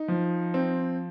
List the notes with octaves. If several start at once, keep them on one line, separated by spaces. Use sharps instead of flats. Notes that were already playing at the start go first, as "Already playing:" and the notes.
Already playing: D#4
F3
C4